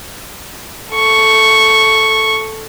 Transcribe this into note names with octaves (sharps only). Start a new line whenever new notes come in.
A4 C#6